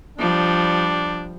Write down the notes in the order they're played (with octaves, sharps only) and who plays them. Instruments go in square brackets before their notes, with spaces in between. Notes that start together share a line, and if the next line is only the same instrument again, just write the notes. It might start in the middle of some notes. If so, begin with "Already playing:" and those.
[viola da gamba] F3 G3 [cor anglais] D4